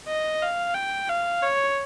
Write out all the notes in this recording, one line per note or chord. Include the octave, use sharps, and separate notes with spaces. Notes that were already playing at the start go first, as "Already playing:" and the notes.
D#5
F5
G5
F5
C#5